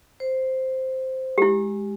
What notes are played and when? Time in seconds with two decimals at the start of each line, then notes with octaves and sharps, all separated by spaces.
0.20 C5
1.38 G#3 E4 G4